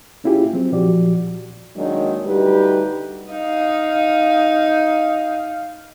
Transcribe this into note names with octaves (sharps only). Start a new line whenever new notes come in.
A#3 C#4 E4 F4 G4 G#4
F#3 C4
A#2 F3 F#4 G4 D5
D#3 F#3 G#3 A#3 D4 D#4
D2 G3 D#4 F#4 G4 B4
D#4 F5